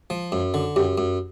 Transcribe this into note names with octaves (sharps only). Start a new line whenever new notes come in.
F3
F#2
D3
F#2 G4
F#2